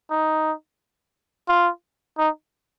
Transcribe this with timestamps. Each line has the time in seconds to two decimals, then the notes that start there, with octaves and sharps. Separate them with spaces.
0.11 D#4
1.48 F4
2.18 D#4